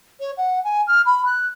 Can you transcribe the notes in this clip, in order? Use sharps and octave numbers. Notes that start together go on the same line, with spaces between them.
C#5
F#5
G#5
F6
B5
F#6